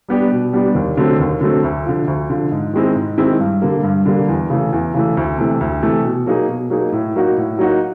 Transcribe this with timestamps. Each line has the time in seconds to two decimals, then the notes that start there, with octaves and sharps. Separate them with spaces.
0.08 G3 B3 D4 G4
0.32 B2
0.53 G3 B3 D4 G4
0.75 D#2
0.97 D3 F#3 A3 C4
1.19 D#2
1.41 D3 F#3 A3 C4
1.64 D2
1.86 D3 F3
2.07 D2
2.30 D3 F3
2.52 G#2
2.73 D#3 G#3 C4 E4
2.95 G#2
3.18 D#3 G#3 C4 E4
3.40 G2
3.62 D3 G3 A#3
3.83 G2
4.06 D3 G3 A#3
4.28 E2
4.50 C#3 E3 A3
4.73 E2
4.94 C#3 E3 A3
5.17 D2
5.38 C3 E3 A3
5.61 D2
5.83 C3 E3 A3
6.05 B2
6.26 F#3 A#3 D#4 G#4
6.49 B2
6.70 F#3 A#3 D#4 G#4
6.93 A2
7.15 F#3 A#3 D#4 F#4
7.37 A2
7.59 F#3 A#3 D#4 F#4